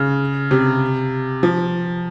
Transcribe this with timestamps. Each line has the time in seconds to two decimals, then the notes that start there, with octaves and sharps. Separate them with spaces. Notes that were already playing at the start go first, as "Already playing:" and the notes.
Already playing: C#3
0.51 C3
1.43 F3